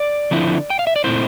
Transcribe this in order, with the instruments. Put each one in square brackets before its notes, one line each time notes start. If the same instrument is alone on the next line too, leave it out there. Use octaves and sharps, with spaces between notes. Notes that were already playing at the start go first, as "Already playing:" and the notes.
Already playing: [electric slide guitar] D5
D3 F3 C4 E4
G5
F5
E5
D5
A#2 A3 C4 E4 C5